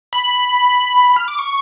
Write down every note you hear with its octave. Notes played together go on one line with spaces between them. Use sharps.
B5
F6
D6
C#6